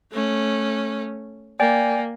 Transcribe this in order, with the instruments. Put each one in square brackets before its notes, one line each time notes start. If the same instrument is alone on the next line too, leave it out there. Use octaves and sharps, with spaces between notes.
[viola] A3 C#4
[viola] A#3 [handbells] D5 G5 G#5